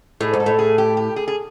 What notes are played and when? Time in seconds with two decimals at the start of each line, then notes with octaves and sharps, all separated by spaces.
0.21 A2 G#4
0.34 G#2
0.40 A4
0.46 A2
0.59 G#4
0.78 G4
0.97 G4
1.16 G#4
1.28 G#4